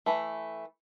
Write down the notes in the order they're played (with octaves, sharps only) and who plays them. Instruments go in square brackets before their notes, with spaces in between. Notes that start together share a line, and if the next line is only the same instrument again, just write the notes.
[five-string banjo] E3 A3